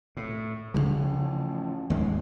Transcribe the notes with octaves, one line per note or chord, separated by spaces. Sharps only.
A2
A1 C#3 E3 F3
D#2 G#2 G#3 A#3